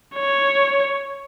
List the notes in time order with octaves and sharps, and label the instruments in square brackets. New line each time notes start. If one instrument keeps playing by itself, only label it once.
[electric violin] C#5